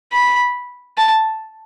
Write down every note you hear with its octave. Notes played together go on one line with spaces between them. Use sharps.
B5
A5